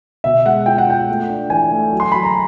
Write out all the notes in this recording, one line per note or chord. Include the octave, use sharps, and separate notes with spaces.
B2 E5
G#3 F#5
F4 G5
F#5
F4 G5
A3
D4
E3 G#5
A3
F#3
C6
F#3 B5
A#5